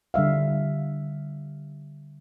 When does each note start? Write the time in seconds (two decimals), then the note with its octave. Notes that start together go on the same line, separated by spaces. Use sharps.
0.14 D3 G3 E5 F5